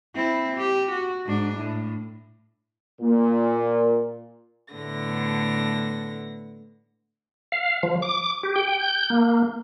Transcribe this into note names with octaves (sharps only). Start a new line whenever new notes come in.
C4 E4
G4
F#4
G#2 D4
A2
A#2
A2 D3 B3 A#6
F5
F3
D6
G4
G5
G6
A#3